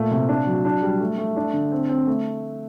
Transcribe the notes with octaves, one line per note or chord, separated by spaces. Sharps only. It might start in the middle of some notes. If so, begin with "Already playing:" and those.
Already playing: A#2 A3
C3
D4
F#3
D4
G3
A3
A3
D4
D3
C4
C4
A3